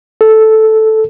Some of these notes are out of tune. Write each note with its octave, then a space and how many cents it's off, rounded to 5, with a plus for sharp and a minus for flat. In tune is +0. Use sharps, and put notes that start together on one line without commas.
A4 -5